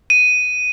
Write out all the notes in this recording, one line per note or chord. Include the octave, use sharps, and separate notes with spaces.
D#7